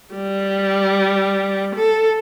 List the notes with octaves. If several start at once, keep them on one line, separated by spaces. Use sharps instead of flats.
G3
A4